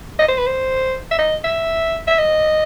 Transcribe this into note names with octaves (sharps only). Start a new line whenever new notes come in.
D#5
C5
B4
C5
E5
D#5
E5
E5
D#5